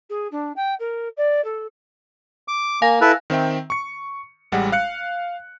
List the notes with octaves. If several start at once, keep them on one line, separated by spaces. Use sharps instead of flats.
G#4
D4
G5
A#4
D5
A4
D6
A#3 F5 G#5 A#6
E4 A4 B4
D#3 C4 E5 G5
C#6 C#7
A1 G3 G#3 F#5
F5 F#6 C#7